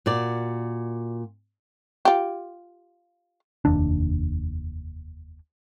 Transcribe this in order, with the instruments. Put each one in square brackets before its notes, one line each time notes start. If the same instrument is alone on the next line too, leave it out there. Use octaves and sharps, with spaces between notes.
[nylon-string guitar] A#2 F#4 D5
[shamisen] F4 G4
[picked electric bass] F1 D#2 D4